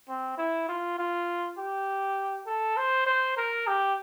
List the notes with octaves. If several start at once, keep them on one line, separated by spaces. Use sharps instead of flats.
C4
E4
F4
F4
G4
A4
C5
C5
A#4
G4